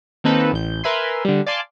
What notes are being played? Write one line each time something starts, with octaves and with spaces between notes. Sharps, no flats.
D#3 A#3 C4 D#4 A4 B4
A1 G6
A#4 B4 E5 G#5 C6
D3 G3
D5 F5 G#5 A5 C6 D6